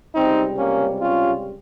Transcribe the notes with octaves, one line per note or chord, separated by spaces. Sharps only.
C#2 C3 G3 C4 D#4
A#3 C#4
C#4 F4